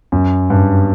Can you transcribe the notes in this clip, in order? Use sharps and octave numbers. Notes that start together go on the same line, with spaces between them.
F#2
G2